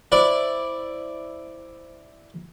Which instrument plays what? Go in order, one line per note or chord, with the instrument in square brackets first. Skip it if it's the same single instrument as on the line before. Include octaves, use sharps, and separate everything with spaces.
[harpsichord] E4 D5 [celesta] C5